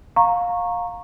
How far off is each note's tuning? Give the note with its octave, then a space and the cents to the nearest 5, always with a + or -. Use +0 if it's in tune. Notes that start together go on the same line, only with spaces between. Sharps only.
F5 +20 A#5 -5 C#6 -15